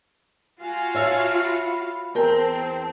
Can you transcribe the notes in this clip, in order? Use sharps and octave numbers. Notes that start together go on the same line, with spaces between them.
F4 F#4 F5 G#5
C#5 E5 A5
B5
E2 C4 A#4 G5 A5